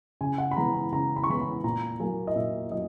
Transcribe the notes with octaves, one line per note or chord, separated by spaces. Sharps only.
C#3 G#5
F#5
B5
E3 G#3 B3 A#5
B5
C#3 A#5
B5
C#6
E3 G#3 B3 B5
B5
A#2 A#5
F#3 A#3 G#5
D#5
A#2 E5
F#3 D#5